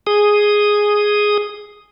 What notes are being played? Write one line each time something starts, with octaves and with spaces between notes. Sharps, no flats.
G#4 D#6